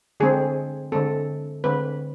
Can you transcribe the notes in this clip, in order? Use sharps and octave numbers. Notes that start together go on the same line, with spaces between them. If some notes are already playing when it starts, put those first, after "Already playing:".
D3 G#3 C4 G#4
D3 G#3 C4 A4
D3 G#3 C4 B4